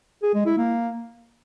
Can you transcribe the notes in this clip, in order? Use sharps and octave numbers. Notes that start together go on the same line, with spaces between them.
G#4
G#3
E4
A#3